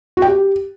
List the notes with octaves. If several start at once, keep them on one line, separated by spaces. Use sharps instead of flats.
F#4
G5
G4